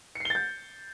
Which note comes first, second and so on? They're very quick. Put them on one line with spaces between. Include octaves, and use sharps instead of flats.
C#7 C7 G7 A6 G6